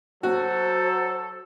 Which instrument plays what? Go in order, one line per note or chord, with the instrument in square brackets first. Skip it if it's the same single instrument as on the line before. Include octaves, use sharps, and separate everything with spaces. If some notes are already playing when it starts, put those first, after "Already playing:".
[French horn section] F#3 [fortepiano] F#4 [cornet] A4 [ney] C5